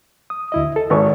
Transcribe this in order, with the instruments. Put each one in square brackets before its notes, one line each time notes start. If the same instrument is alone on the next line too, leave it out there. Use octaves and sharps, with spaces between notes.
[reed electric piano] D#6
D2 E4 D#5
A4
[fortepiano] G#1 B4 C#6